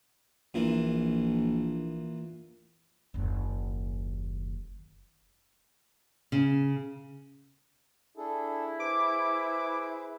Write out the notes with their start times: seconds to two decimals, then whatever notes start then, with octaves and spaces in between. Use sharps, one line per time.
0.54 A#1 A#2 E3
3.14 F#1 D#2
6.32 C#3
8.17 D4 E4 G#4 A4
8.80 G#4 B4 C5 D6